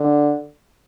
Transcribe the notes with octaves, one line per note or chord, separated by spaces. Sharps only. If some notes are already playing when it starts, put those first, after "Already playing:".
Already playing: D3